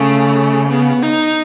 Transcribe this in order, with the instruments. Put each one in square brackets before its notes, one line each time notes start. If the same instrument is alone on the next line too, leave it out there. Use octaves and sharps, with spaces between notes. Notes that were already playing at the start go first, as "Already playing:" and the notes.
Already playing: [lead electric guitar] C#3 [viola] A3
[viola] B3
D#4